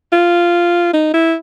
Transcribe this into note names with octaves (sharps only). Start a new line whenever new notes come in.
F4
D#4
E4